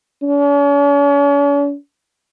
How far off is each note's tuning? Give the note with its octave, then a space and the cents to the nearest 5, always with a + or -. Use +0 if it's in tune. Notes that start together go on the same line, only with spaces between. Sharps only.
C#4 +45